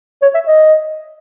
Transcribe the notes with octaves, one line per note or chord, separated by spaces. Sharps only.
C#5
E5
D#5